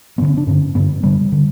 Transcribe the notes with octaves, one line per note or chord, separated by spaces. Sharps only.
G2 D3 B3
C#4
D4
G2 D3 C#4
G2 D3 B3
G2 D3 G3
D3